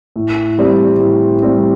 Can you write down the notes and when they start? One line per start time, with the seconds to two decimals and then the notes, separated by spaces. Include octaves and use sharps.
0.16 A2
0.59 G3 C4
1.00 A2
1.42 G3 C4